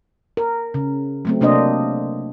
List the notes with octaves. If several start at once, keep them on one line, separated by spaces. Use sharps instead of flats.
A#4
C#3
F#3 A3 C4
C3 A#3 D4 C5 D#5